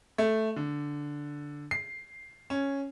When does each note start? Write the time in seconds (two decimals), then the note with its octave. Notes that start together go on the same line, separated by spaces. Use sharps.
0.18 A3
0.56 D3
1.71 C7
2.50 C#4